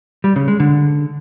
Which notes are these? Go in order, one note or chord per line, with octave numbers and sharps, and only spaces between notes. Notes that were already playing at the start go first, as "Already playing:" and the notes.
G3
C#3
G#3
D3